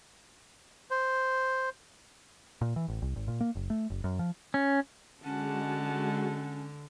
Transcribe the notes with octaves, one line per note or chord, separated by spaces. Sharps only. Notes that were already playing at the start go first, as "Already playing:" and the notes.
C5
A#2
E3
A1
C2
G#1
A#2
A#3
F#1
A3
F#1
F#2
F3
C#4
D3 G#3 C#4 F#4 F#5 A5